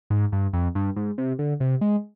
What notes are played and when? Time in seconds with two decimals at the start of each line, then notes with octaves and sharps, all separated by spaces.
0.10 G#2
0.32 G2
0.53 F2
0.75 G2
0.96 G#2
1.18 C3
1.39 D3
1.60 C3
1.81 G#3